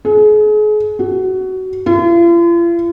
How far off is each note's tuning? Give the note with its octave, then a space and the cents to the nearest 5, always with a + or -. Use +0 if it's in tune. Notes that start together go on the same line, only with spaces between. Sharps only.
G#4 +35
F#4 +20
F4 -45